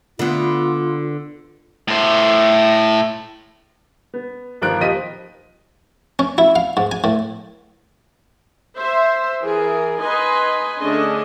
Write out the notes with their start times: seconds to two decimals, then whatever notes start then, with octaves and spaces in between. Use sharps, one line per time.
0.19 D3 B3 F4
1.88 A2 C5
4.14 B3
4.62 G1 D#3 F3 A#4 F#6 D7
4.81 D#1 F3 G4 D#5 B6 D#7
6.19 C#4
6.38 E4
6.56 F5
6.77 G#2
6.92 G#5
7.04 A2
8.76 C5 E5
9.42 E3 G#4 A#4
10.00 D#4 B4 D#5 G#5 C6
10.81 D3 A3 C#4 D4 G#4 D#5